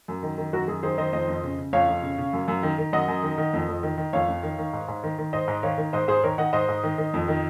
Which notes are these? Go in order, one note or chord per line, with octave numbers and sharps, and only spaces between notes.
F#2
D#3
D#3
F#2 F#4 A#4
F#2 G#4
D#3 G#4 C5
D#3 C5 D#5
F2 C5 D#5
F2
C#3
C#3
F2 C#5 F5
F2
C#3
C#3
F#2
F#2
D#3
D#3
F#2 D#5 F#5
F#2
D#3
D#3
F2
F2
D#3
D#3
F2 C#5 F5
F2
D#3
D#3
G#2
G#2
D#3
D#3
G#2 C5 D#5
G#2
D#3 C#5 F5
D#3
G#2 C5 D#5
G#2 G#4 C5
D#3 A#4 C#5
D#3 D#5 F#5
G#2 C5 D#5
G#2
D#3
D#3
F2
D#3